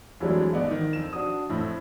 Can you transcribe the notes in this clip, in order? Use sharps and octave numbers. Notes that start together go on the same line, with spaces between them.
F2 E3 F#3 G#3 A3 D4
G#1 B3 D5 D#5
D#3
F2 E7
D4 F#4 D#6
F2 A2